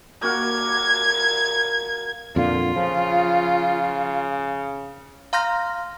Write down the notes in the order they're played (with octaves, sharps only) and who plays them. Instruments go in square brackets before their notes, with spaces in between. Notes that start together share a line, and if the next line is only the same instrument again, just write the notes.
[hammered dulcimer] A#3 F#4 A#4 [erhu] G#6
[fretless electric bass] F2 A#2 D3 [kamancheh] F4
[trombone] C#3 [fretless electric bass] F3
[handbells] F5 A#5 C6 F6 G6 A#6